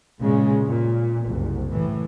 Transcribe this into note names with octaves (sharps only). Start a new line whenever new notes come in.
G2 A#2 C#3 G#3
A#2
F#1 C2
A2 E3